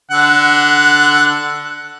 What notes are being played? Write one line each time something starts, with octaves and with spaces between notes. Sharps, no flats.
D3 F#5